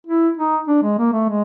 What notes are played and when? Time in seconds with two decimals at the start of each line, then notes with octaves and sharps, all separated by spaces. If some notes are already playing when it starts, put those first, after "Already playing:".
0.07 E4
0.37 D#4
0.68 D4
0.83 G#3
0.99 A#3
1.13 A3
1.29 G#3